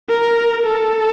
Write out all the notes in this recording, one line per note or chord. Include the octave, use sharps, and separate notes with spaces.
A#4
A4